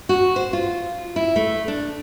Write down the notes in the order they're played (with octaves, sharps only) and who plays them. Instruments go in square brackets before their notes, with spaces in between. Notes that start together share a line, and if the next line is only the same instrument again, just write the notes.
[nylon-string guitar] F#4
C5
F4
E4
A3
D4